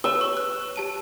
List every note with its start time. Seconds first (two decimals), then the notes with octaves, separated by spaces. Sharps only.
0.04 G4 C#5 E6 G7
0.21 C#6
0.37 F#6
0.76 G4 A5 D#7